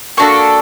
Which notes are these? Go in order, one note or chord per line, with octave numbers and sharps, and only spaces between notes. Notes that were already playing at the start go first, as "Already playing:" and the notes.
A#3 D4 F#4 A4 C#6